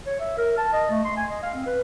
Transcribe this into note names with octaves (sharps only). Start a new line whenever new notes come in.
C#5
E5
A#4
A5
D#5
A3
C6
G#5
D#5
F5
C4
B4